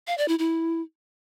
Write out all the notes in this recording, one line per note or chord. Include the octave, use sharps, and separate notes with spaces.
F5
D5
E4
E4